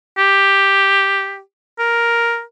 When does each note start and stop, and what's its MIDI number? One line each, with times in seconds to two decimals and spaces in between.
0.18 1.40 67
1.79 2.42 70